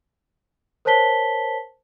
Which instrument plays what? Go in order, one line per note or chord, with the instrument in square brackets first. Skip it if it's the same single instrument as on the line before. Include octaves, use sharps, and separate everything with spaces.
[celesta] A#4 C5 C#5 A5 B6 G7